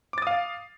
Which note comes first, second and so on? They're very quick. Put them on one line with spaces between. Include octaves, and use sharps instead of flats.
D6 A6 D#6 F5